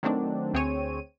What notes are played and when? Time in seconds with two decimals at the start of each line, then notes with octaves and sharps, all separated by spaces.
0.03 D#3 F#3 A3 C4 D4 D#4
0.54 D2 C4 G#4 C#5 D#7